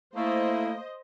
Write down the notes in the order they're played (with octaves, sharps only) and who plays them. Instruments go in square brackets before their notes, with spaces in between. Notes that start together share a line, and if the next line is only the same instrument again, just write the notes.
[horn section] A3 [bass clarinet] A#3 [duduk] E4 [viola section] C5 D#5